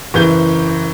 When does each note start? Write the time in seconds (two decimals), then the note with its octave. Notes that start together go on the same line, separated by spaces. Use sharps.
0.14 F#1 E3 G6 G7